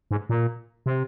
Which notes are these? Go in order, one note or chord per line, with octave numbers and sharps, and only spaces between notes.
G#2
A#2
C3